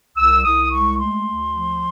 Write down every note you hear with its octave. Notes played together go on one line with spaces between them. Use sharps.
C2 E6
C2 D#6
G#3 C#6
A3 C6
D2
F3